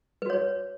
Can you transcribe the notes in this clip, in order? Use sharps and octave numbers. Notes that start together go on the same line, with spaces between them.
F#4 B4 C#5